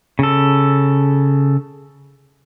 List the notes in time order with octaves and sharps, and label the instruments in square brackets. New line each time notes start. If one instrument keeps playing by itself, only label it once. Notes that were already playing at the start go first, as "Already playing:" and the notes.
[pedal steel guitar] C#3 A4